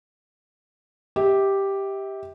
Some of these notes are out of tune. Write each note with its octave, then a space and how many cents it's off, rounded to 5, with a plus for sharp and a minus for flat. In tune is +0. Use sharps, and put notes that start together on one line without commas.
G4 +0 E5 -35